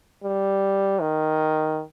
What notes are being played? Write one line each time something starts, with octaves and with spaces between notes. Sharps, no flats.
G3
D#3